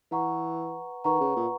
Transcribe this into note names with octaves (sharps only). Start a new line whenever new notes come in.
E3 B4 F#5 A#5 C#6
D#3 B4 F#5 A#5 C#6
C#3
A#2